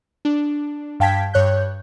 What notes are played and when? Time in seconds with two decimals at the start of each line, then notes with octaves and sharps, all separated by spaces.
0.25 D4
1.00 G2 F5 G5 A5 G#6 B6
1.33 G2 C#5 F#6 G6